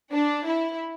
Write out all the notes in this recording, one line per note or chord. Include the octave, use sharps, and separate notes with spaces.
D4
E4